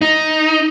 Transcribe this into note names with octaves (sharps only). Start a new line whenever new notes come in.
D#4